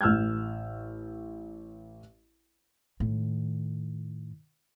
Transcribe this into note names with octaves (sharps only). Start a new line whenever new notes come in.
A1 E6 F6 G6 G#6
A2 D#3